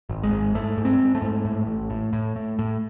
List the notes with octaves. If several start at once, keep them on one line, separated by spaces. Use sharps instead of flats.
G#1
G#3
G#2
G#2 A3
G#2
C4
G#2
A3
G#2
A2
A1
A2
A2
A2
A2